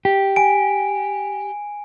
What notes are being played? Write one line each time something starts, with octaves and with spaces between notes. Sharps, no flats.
G4
G#5 D7